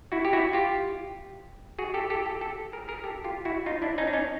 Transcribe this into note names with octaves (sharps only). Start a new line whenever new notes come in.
E4 F#4
G4
E4 F#4
F4 G4
F#4 G#4
G4 A4
G4 A4
G4 A4
G4 A4
G#4 A#4
G#4 A#4
G4 A4
F4 G4
E4 F#4
D#4 F4
D4 E4
C#4 D#4
D4
C#4 D#4